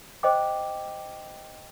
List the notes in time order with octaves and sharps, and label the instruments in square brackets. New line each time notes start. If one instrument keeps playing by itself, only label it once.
[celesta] C5 D#5 G5 D6